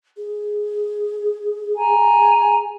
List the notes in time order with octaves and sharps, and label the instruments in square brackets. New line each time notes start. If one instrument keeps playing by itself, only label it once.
[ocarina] G#4
[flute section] G#5 A#5